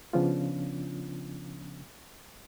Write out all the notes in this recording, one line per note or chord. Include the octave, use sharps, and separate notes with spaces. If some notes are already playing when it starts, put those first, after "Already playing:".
C#3 F3 B3 C#4 D4 F4